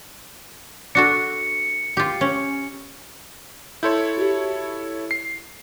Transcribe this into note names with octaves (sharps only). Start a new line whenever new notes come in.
D4 F#4 A4 C#7
F4 G4
C#4
E4 A4 C#5 C6 G6
F#4 G4
C7